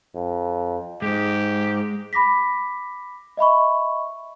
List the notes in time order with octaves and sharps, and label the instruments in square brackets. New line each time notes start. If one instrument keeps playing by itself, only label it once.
[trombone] F2
[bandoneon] G#2 [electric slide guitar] G#3 [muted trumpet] G4
[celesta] B5 D6 A#6 B6
D#5 E5 B5 C#6